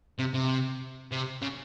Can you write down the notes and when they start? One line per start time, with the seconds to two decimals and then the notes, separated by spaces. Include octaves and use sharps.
0.19 C3
0.34 C3
1.12 C3
1.42 C#3